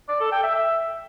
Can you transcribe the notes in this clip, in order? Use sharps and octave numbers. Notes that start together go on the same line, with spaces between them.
D5
A4
G5
E5
E5